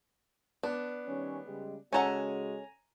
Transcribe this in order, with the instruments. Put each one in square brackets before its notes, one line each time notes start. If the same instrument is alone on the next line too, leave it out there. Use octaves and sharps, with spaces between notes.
[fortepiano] B3 [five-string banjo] D4
[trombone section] D#3 G3 C#4
C#3 G3 G#3
[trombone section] C#3 G#3 F#4 [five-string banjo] C#4 A4 F#5 [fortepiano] G#5 A#5